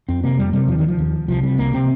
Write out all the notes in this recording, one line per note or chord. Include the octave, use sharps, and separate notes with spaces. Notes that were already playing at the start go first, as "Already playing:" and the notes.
F2 C4
C3 A#3
F2 G3
C3 G3
D#2 F3
D#3
F3
D#2
C2 F3
C3 G3
C2 A#3
C3 C4